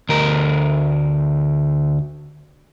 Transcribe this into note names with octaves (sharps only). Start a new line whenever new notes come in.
D2 A#4